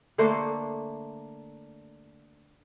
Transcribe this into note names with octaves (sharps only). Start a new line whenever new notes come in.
D3 A3 A#3 C5